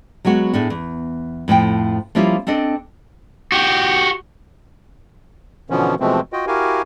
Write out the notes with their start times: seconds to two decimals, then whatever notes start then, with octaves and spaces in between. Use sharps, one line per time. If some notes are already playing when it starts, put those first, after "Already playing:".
0.25 F#3 G#3 B3 F#4
0.53 A2 A3 D4 G#4
0.70 E2
1.48 F2 A2 F3 G5
2.15 F3 G3 A#3 C#4 E4 F4
2.47 C4 D4 A4 D#5
3.52 F#4 G4
5.70 B2 D3 E3 F3 B3 C#4
6.00 B2 E3 F3 G#3 A3 C4
6.33 F4 F#4 D#5 G5
6.47 E4 F#4 G4 A#4 F5 G#5